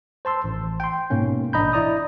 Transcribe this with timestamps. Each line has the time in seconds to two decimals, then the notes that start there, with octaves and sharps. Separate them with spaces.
0.25 C5 A5 C6 E6
0.44 A1
0.80 G5 C6
1.10 G#2 B2 A#3 C#4
1.53 A1 D4 D#5 A#5 B5 G6
1.73 E4 D5 A#5 D#6